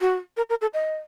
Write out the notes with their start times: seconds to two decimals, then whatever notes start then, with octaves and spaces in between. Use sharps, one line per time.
0.01 F#4
0.37 A#4
0.49 A#4
0.61 A4
0.74 D#5